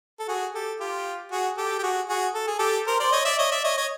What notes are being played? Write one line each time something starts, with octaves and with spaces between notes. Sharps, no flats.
A4
F#4 G#4
G4 A4
F4 G4
F#4 G#4
G4 A4
G4
F#4 G#4
F#4 G#4
A4
G#4
G4 A4
A#4 C5
C5 D5
C#5 D#5
D5 E5
C#5 D#5
D5 E5
C#5 D#5
C#5 D#5